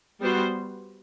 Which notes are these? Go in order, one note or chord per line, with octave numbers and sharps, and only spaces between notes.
G3 B3 F#4 C5